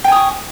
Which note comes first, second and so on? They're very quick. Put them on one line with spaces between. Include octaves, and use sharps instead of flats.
G5 G#5 D#6 C#6